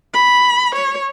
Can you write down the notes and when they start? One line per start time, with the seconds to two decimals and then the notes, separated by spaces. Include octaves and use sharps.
0.14 B5
0.75 C#5